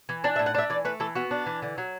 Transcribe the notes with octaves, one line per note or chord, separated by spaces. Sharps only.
E3
D4 D5
E5
A2
F#5
D4 E5
E3 D5
A3 B4
E3 A4
B3 F#4
D4
E3
D3
F#3